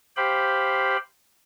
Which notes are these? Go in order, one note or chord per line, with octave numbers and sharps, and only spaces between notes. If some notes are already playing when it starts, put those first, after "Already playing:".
G4 C5 F5 G5 B5